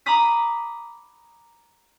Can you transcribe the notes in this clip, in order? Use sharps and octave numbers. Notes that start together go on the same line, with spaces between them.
A#5 B5 D6 D#6 B6